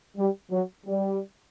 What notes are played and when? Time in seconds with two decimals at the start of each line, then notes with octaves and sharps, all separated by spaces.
0.17 G3
0.51 F#3
0.86 G3